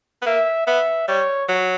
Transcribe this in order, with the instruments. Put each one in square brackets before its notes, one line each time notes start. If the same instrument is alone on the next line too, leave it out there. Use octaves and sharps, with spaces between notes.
[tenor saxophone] B3
[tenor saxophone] A#3 [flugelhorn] E5
[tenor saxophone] B3 [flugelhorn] E5
[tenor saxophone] G3 [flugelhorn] C#5
[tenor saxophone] F#3